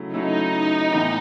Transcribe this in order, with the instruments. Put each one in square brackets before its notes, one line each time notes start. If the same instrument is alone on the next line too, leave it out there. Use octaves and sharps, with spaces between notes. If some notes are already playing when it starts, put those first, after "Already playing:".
Already playing: [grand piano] C#3 F#3 A3 E4
[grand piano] C#3 F#3 A3 E4 [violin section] D#4
[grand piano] A2 E3 B3